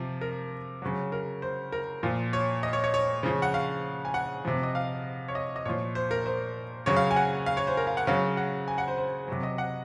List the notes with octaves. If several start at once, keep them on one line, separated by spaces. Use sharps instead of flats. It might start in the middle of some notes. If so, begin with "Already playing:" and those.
Already playing: C3 F3
A#4
C#3 F#3
A#4
C5
A#4
A#2 F3
C#5
D#5
C#5
C#5
C#5
C#3 F3
F#5
F5
G#5
F#5
C3 F3
D#5
F5
C#5
D#5
D#5
A#2 F3 C#5
C5
A#4
C5
C#3 F#3 C#5
F5
G#5
F#5
F5
C#5
C5
A#4
F5
F#5
C#3 F#3 F5
F#5
G#5
F#5
C5
C5
C3 F#3
D#5
F#5